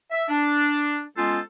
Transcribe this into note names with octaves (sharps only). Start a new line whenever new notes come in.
E5
D4
G#3 B3 C#4 F4 A4 C5